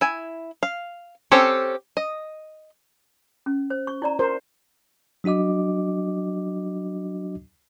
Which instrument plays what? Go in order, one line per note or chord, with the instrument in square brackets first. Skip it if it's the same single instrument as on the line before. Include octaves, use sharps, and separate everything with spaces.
[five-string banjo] E4 G#5
F5
C4 C#4 G4 A4 C#5
D#5
[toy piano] C#4
C5
C#6
E4 D5 A#5
[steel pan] A#4 C5
[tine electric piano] F#3 D4 F#4 D#5 D6